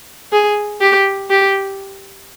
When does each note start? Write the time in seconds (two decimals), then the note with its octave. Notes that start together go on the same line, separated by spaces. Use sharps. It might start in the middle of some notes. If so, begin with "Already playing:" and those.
0.32 G#4
0.81 G4
1.30 G4